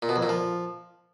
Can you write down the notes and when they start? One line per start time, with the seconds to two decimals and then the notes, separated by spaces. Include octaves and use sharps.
0.02 A#2
0.09 B2
0.16 F2
0.23 A#2
0.29 F3